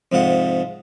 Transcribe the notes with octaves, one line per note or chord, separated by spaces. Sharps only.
F2 G#2 C3 F4 F#5